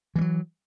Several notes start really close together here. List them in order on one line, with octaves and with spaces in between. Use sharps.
E3 G3 F#3